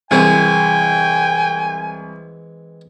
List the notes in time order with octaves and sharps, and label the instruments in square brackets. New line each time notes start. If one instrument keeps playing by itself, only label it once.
[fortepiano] C2 [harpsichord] E3 G#3 C4 [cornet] G5 [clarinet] G#5